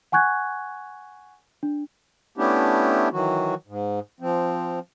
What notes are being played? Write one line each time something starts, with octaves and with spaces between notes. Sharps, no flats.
F#5 G#5 C#6 F#6 G#6
D4
A3 B3 C#4 D4 E4 G4
D#3 E3 F#3 F#4
G#2
F3 C4